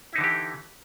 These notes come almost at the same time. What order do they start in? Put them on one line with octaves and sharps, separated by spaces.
E4 D#4 D3 E3 G4